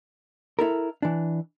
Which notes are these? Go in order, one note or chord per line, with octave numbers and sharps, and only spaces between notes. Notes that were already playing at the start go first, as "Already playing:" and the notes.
E4 A4 A#4
E3 D4